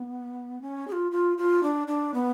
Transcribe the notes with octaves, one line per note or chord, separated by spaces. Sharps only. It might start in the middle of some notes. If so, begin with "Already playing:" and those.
Already playing: B3
C#4
G#4
F4
F4
F4
D4
D4
B3